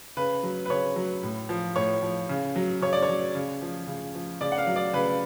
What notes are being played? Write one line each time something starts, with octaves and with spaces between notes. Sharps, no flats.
C#3 B4
F#3
B4
C#3 C#5
F#3
A2
F3
A2 C#5
F3
C#3
F#3
C#3 C#5
D5
C#5
F#3
C#3
F3
C#3
F3
C#3 D5
F#5
F5
F#3
D5
C#3 B4